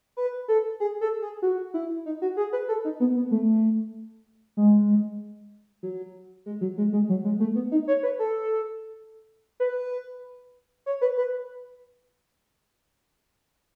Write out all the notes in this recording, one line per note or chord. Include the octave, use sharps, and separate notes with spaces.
B4
A4
G#4
A4
G#4
F#4
E4
D#4
F#4
G#4
B4
A4
D#4
B3
B3
A3
G#3
F#3
G#3
F#3
G#3
G#3
F#3
G#3
A3
B3
D#4
C#5
B4
A4
B4
C#5
B4
B4